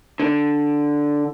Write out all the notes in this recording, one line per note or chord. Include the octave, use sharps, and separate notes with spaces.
D3